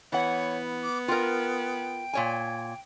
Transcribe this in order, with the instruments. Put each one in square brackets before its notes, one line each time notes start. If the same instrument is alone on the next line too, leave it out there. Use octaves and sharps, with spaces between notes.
[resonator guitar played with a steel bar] E3 F#5 [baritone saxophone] B3 [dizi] C#5
[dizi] D6
[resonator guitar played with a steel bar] F4 A#4 [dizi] G5
[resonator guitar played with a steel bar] A#2 C#5 G#5